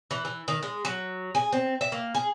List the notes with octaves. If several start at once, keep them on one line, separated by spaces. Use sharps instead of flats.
E3
E3
D#3
G#3
F#3
G#4
C4
E5
A#3
G#4